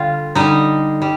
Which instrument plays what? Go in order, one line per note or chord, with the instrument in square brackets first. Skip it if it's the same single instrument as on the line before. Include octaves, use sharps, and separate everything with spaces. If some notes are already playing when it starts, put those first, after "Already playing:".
Already playing: [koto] D3 G3 F4 F5
D3 G3 D#4 D#5
G3